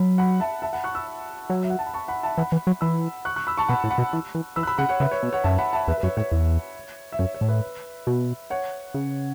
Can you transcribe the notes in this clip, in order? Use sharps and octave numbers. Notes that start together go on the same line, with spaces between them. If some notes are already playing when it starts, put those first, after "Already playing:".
Already playing: F#3 B5
F#5 B5
E5 A5
E5 A5
F#5 B5
C#6 F#6
B5 E6
F#3
E5
F#5
A5
B5
A5 C#6
F#5 B5
E5 A5
E3 F#5 B5
E3
F#3
E3 B5 E6
C#6 F#6
C#6 F#6
B5 E6
A5 C#6
B2 F#5 B5
A2
F#5 B5
B2
E3
E3
E3 B5 E6
F#6
B5 E6
C#3 F#5 B5
C#5 F#5
C#3 B4 E5
C#5
B2
C#5 F#5
F#2 E5 A5
F#5 B5
E5 A5
E2 B4 E5
B4
F#2 C#5
A2 C#5
E2
E5
F#2 C#5
C#5
A2
B4 E5
B2
C#5 F#5
C#3